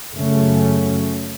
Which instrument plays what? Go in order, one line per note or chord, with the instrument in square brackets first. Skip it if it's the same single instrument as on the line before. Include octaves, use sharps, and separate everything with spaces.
[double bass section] F#2 C#3 F#3 A3 C#4